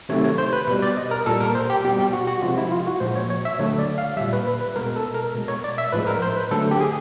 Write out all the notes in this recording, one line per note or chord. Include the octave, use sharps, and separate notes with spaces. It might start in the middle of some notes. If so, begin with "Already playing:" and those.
C3 D#3 F#3 A3 C#5
C#5
C5
B4
B2 G3 B4
D5
D#5
A#4
A#2 G3 A4
A#4
C5
G4
B2 G3 G4
G4
F#4
F#4
C3 F3 G#3 F4
E4
F4
F#4
A#2 F3 G#3 C5
C#5
C#5
E5
D3 F#3 A3 C#5
D5
F5
A#2 G3 E5
B4
B4
B4
B2 G#3 A#4
A4
A#4
B2 G#3
C#5
D5
E5
A2 F3 G#3 B4
A#4
C5
B4
D3 F#3 A3 A4
G4
G#4